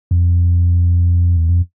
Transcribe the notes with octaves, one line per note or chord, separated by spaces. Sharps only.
F2
E2
F2